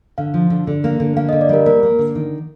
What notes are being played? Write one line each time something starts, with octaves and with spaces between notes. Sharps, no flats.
D3 F5
F3
D3
D3
A#3
D3
A#3 F5
D#5
D3
D5
G3 A#4
A#3 A#4
A#3
D3
D#3